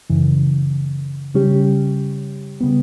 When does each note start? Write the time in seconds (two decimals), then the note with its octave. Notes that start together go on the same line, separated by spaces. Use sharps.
0.10 F#2 C#3 E3
1.34 C#3 G3 C#4 G4
2.61 C#3 G3 B3